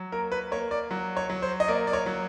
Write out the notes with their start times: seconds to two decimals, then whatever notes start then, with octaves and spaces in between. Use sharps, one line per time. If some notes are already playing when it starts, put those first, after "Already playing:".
Already playing: F#3
0.12 A#3 A#4
0.32 B4
0.51 A#3 C#5
0.71 D5
0.91 F#3
1.17 C#5
1.30 F#3
1.42 C5
1.60 D#5
1.68 A#3 D5
1.87 D5
1.93 C#5
2.06 F#3